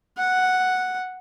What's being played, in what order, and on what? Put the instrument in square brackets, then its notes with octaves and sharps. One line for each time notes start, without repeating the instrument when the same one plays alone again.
[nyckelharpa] F#5